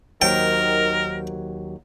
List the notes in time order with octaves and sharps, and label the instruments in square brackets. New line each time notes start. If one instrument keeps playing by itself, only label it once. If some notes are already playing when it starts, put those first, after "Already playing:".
[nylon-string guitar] D#2 F#3 C5 [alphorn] D#3 [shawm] A#4 [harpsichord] G5